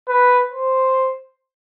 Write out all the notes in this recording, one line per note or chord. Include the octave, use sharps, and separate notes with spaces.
B4
C5